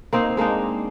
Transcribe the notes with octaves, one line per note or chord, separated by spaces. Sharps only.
A#3 C4 D#4
G#3 A#3 D4 D#4